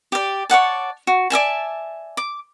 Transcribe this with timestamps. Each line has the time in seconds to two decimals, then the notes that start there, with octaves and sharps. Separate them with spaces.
0.12 G4 D5
0.50 C#5 D5 F#5 A5
1.07 F#4
1.30 D5 E5 G#5 A5
2.17 D6